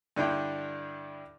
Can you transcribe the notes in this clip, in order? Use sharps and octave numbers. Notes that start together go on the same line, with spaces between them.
G2 D3 D4 E4 G5